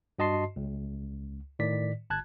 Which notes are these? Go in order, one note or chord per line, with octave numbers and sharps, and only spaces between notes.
G2 F#4 D#5 A5 C6 C7
C#2
A2 D#3 D5 B6
G1 A5 F#6 G#6